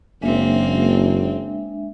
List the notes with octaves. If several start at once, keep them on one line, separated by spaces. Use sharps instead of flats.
F#1 G#3 A#3 C4 D4 E5